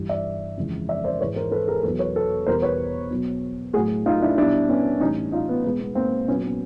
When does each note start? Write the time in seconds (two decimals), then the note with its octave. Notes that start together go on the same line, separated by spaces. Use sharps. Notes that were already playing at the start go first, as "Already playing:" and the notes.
Already playing: G2 E3 G3
0.09 D5 E5
0.57 F2 C#3 E3 G#3
0.89 D5 E5
1.04 C5 D5
1.20 G#2 E3 G#3 B4 C#5
1.36 A#4 C5
1.51 A4 B4
1.68 G#4 A#4
1.83 E2 B2 F#3 A4 B4
1.99 B4 C#5
2.16 A4 B4
2.47 E2 B2 G3 A#4 C5
2.62 B4 C#5
3.11 B2 F#3
3.73 A2 F#4 G#4
3.78 F#3
4.06 D#4 F4
4.22 D4 E4
4.38 B2 G3 D4 E4
4.69 B3 C#4
5.00 A2 E3 G3 C#4 D#4
5.32 D#4 F4
5.49 B3
5.64 B2 G#3 B3
5.81 B3
5.95 A#3 C4
6.28 A#2 F#3 B3 C#4
6.43 B3 C#4